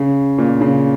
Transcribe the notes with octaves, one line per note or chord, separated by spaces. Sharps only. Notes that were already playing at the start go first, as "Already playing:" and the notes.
Already playing: C#3
A#2
C#3